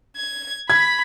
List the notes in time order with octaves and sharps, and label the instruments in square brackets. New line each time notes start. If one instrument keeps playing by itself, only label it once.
[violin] G#6
[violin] B5 B6 [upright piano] G#6